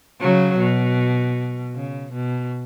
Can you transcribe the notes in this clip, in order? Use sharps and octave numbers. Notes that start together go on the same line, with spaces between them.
C#3 F#3
B2
C#3
B2